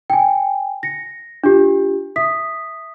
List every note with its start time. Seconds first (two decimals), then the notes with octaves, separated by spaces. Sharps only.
0.10 G5 G#5
0.83 A#6 C#7
1.44 D4 F4 G4
2.16 E5 D#6 B6